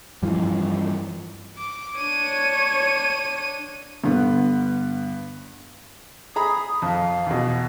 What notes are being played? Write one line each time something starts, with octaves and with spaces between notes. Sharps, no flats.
G2 E3 F3
D6
D4 C#5 D#7
G2 D3 B3
G#4 A#5 B5 D#6
F2 F5
E2 B2